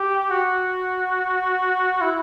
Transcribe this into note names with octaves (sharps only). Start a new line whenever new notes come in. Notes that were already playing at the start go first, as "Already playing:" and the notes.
Already playing: G4
F#4
E4